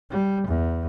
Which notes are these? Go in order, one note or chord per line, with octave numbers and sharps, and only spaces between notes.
G3
E2